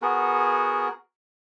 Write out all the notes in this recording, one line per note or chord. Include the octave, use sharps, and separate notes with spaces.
B3 F#4 G#4 A#4